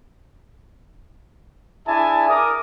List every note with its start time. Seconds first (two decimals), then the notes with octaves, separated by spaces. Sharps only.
1.86 D4 E4 G#4 E5 G#5 A5
2.28 A#4 D6 D#6